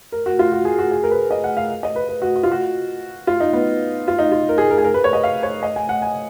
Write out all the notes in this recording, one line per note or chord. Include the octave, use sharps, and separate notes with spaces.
A#4
F#4
F4
F#4
G#4
F#4
G#4
A#4
B4
D#5
F#5
F5
D#5
B4
B4
F#4
F#4
F4
F#4
F4
D#4
B3
F4
D#4
F4
A#4
G#4
A#4
G#4
A#4
B4
C#5
D#5
F5
C#5
D#5
G#5
F#5
G#5